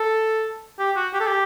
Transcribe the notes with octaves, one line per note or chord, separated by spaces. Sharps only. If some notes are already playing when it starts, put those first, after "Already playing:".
Already playing: A4
G4
F#4
G4
A4
G4